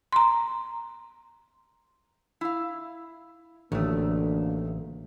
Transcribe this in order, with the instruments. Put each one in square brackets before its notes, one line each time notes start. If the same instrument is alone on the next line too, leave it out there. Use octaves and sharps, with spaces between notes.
[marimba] A#5 C6
[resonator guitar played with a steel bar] E4 F5
[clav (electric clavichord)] A1 [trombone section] D2 D3 A#3 [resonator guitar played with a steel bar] D#3 A3